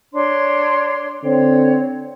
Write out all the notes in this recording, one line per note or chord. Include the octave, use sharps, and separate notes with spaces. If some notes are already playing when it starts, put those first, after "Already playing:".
D4 C#5 C6
D3 C4 C#5